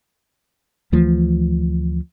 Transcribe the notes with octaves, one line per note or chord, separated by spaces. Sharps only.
D2 E3 F3 A3